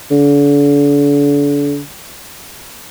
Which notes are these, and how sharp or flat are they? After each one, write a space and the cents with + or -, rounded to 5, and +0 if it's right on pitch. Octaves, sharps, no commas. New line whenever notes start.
D3 -40